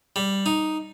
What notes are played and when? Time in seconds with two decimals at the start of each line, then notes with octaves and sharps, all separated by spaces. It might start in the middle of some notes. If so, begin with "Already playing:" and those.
0.16 G3
0.46 D#4